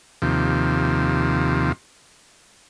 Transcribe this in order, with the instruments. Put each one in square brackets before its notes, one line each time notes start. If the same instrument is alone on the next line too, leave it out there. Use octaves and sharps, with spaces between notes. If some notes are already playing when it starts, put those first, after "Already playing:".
[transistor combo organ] D#2 C3 F3